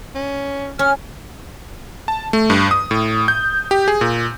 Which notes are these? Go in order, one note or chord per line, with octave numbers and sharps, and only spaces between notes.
C#4
C#4 F6
A5
A3
G2
D#6
A2
G6
G4
G#4
A#2